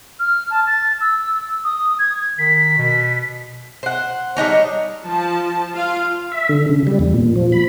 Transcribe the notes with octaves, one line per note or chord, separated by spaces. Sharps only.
F6
A5
A6
E6
D#6
G#6
D#3 B6
B2
C5 F#5
G3 D4 D#4 C#5
F3 A5
F4 F5
E5
D3
C#3
G3
E2
A#2
F3
B5